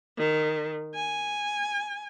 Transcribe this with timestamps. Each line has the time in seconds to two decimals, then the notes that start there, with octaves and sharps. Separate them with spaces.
0.18 D#3
0.94 G#5